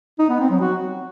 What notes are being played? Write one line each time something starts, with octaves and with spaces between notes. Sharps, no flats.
D#4
B3
C4
F#3
F#4